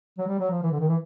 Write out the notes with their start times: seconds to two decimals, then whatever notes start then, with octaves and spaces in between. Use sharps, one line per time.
0.18 F#3
0.27 G3
0.39 F#3
0.51 F3
0.62 E3
0.71 D3
0.79 D#3
0.88 E3